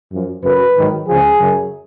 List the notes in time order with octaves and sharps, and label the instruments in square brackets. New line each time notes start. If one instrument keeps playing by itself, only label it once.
[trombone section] F#2 F3
F#2 C#3 F#3 B4
G#2 D#3 F#3
C#2 C#3 F3 G#4
F#2 C#3 F#3